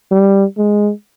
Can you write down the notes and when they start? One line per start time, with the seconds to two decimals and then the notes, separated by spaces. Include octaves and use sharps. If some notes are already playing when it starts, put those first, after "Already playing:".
0.12 G3
0.58 G#3